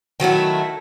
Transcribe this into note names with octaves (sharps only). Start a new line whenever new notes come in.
D#3 F#3 A3 E4